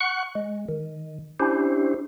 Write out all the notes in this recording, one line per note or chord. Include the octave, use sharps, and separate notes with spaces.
F#5 C#6 F#6
G#3
D#3
C#4 D4 E4 G4 C5